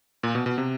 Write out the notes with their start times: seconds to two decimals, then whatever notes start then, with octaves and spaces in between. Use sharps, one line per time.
0.23 A#2
0.35 B2
0.46 B2
0.58 C3